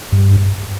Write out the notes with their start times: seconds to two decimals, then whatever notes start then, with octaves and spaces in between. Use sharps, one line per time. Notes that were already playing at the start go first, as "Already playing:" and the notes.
0.12 G2